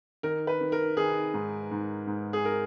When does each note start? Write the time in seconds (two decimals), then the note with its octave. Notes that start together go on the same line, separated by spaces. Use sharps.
0.23 D#3 A#4
0.47 B4
0.61 D#3
0.72 A#4
0.97 D#3 G#4
1.34 G#2
1.71 G#2
2.07 G#2
2.33 G#4
2.45 A#4